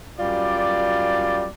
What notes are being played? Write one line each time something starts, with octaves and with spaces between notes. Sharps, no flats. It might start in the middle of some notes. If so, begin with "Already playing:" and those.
F#2 G3 F4 D5